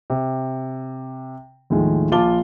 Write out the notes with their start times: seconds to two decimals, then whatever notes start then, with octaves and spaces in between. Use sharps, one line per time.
0.10 C3
1.70 D#2 A2 D#3 F3 G#3
2.12 A#1 F4 A5 D6 G7